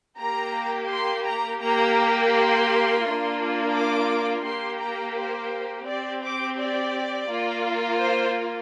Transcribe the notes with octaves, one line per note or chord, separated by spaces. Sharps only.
A#3 G4 A#5
C6
A#5
A#3 G4 A#5
C6
A#3 D4 F4
D6
A#3 G4 C6
A#5
C5
C4 G4 D5
D6
D5
A#3 F4
C5